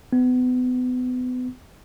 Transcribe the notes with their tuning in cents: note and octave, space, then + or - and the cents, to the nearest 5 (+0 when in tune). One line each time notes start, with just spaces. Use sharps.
B3 +30